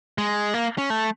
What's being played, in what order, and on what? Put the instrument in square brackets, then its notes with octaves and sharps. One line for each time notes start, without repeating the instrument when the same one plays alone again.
[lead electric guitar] G#3
A#3
C#4
A3